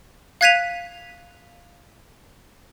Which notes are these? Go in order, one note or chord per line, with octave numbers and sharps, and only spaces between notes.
F5 F#6 G#6 B6 D#7 F7